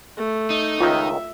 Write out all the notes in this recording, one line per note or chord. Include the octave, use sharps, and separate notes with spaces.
A3
D#4
C#2 D#3 F4 E5